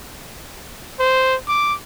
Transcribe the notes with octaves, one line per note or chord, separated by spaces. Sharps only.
C5
D6